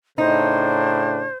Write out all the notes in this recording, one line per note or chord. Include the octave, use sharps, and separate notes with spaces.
A2 C#3 D4 D#4 C5